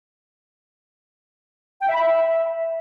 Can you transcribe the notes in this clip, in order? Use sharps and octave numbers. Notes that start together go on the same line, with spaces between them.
G5
E5
B5
E5